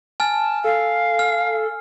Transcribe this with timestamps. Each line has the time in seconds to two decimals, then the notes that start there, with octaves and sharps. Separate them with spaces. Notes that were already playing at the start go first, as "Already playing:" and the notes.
0.20 G#5 A5 F6
0.64 A4 F5
1.19 F6